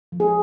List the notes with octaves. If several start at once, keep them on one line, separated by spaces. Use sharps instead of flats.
F3
G#4